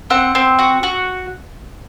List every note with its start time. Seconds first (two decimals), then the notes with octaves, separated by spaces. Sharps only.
0.10 C4 F#5
0.35 C4
0.59 F#4
0.83 F#4